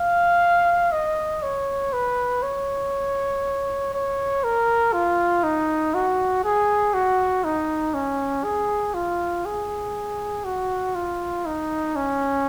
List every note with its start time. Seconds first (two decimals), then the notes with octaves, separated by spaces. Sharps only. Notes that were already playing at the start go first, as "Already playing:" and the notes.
Already playing: F5
0.92 D#5
1.43 C#5
1.93 B4
2.42 C#5
3.93 C#5
4.44 A#4
4.93 F4
5.43 D#4
5.94 F#4
6.44 G#4
6.94 F#4
7.44 D#4
7.94 C#4
8.44 G#4
8.94 F4
9.45 G#4
10.45 F#4
10.95 F4
11.46 D#4
11.96 C#4